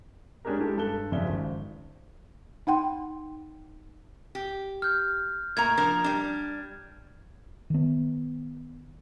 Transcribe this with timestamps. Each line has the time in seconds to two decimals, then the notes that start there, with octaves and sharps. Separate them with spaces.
0.45 G#3 C#4 D4 G4 G#4 A#4
0.59 G#3 E4 G4 A4
0.77 G2 A4 F#6 G7
1.12 D1 F2 C#3 D5 E5 G7
1.27 G#1
2.67 D#4 F#5 G5 C6
4.35 G4
4.82 F6 G6
5.57 A2 A#3 A#5 G#6
5.77 F3 D4 A#4
6.04 G3 D4
7.70 D#3 B3